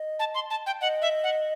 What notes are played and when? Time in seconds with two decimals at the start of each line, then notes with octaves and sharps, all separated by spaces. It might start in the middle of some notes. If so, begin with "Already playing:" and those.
Already playing: D#5
0.19 A5
0.35 C6
0.50 A5
0.66 G5
0.81 D#5 F#5
1.02 E5
1.24 F#5